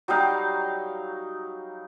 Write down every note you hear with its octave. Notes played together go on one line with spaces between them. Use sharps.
F#3 G3 D#4 F5